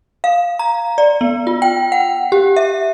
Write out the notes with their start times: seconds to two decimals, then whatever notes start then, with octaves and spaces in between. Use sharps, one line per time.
0.24 F5
0.59 A#5
0.98 D5
1.21 B3
1.47 F4
1.62 G5
1.92 F#5
2.32 G4
2.56 E5